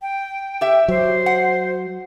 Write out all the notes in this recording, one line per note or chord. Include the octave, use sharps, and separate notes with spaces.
G5
G4 E5
F#3 C5
F#5